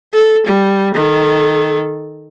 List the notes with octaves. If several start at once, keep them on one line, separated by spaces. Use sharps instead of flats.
A4
G3
D#3 A4